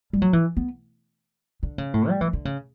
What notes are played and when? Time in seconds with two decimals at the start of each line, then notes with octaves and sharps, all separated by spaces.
0.13 G3
0.22 F#3
0.33 E3
0.57 B3
1.63 D3
1.78 C#3
1.94 A2
2.09 G3
2.21 E3
2.33 D3
2.45 C#3